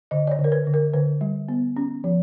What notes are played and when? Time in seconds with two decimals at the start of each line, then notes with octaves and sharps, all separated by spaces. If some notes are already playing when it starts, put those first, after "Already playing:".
0.11 D3 D#5
0.27 D5
0.31 C#5
0.39 D3
0.44 A#4
0.52 B4
0.67 D3
0.74 A#4
0.93 D3 B4
1.21 G3
1.48 B3
1.76 C#4
2.04 F3